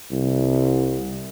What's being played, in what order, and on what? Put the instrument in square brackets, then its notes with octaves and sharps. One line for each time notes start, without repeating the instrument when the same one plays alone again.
[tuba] C2